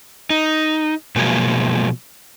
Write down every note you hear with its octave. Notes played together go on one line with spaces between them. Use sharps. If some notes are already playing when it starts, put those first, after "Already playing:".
D#4
B2 F3 F#3 G#3 A#3